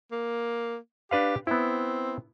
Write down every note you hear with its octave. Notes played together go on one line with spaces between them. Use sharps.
A#3
D4 G4 B4 F5
B3 C4 E4